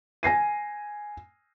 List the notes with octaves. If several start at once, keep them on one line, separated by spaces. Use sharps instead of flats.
G#5 A#6 C7 D#7